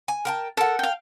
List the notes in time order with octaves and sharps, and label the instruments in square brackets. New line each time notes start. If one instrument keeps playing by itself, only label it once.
[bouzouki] G#5
A#4 G5 A5
[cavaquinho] A4 [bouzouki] A#4 F#5
[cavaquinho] F5 G5